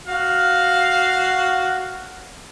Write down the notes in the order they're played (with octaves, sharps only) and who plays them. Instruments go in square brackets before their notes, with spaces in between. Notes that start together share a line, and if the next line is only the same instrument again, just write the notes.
[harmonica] F#4 F5